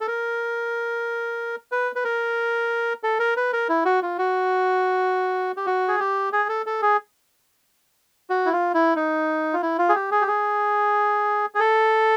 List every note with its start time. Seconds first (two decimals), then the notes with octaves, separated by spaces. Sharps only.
0.01 A4
0.07 A#4
1.72 B4
1.96 B4
2.04 A#4
3.03 A4
3.19 A#4
3.37 B4
3.53 A#4
3.69 E4
3.85 F#4
4.02 F4
4.18 F#4
5.57 G4
5.66 F#4
5.88 G#4
6.00 G4
6.33 G#4
6.49 A4
6.66 A4
6.82 G#4
8.30 F#4
8.46 E4
8.53 F4
8.74 E4
8.96 D#4
9.54 F4
9.62 E4
9.78 F4
9.89 G#4
9.95 G4
10.11 G#4
10.21 G4
10.27 G#4
11.55 G#4
11.60 A4